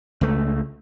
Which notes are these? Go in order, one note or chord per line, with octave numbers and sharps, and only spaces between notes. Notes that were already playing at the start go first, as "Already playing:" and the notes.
C#2 A3